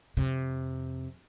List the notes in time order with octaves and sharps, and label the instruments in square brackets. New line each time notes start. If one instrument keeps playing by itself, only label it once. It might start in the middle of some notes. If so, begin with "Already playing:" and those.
[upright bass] F2 C3